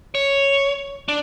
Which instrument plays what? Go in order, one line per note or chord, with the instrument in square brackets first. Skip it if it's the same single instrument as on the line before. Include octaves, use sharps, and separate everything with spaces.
[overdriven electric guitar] C#5
D4